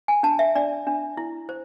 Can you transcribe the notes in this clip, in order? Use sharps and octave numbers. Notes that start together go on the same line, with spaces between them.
G#5
D4 A5
E5
D4 D5
D4
E4
C5